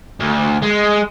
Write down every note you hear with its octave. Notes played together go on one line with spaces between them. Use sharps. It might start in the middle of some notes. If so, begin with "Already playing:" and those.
D2
G#3